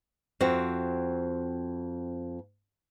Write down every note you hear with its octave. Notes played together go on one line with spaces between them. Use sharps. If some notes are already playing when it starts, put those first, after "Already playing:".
F2 C4 F#4